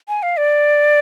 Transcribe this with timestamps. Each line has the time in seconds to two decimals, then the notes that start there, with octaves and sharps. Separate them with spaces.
0.08 G#5
0.23 F5
0.37 D5